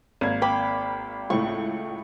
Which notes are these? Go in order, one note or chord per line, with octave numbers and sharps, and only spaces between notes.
G#1 A#3 G#6
G5 B5 D6
C#2 A2 C#6